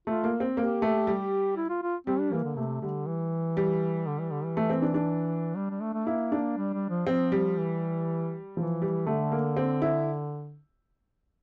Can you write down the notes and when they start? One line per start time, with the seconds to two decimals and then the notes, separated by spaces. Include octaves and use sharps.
0.07 A3 F4
0.24 A#3
0.40 C4
0.57 A#3 G4
0.82 A3
1.07 G3
1.56 E4
1.70 F4
1.83 F4
2.07 G3 C4
2.20 D4
2.32 E3 A#3
2.45 D3
2.57 C3 A3
2.82 D3 G3
3.07 E3
3.57 G3
4.07 D3
4.20 E3
4.31 D3
4.44 E3
4.57 A3
4.70 C4
4.82 D4
4.94 D4
5.56 G3
5.70 G3
5.82 A3
5.94 A3
6.07 A#3 E4
6.32 D4
6.57 G3
6.73 G3
6.90 F3
7.07 F3 C4
7.32 G3
7.57 E3
8.57 E3 F3
8.82 G3
9.07 D3 A3
9.32 A#3
9.57 C4
9.82 E4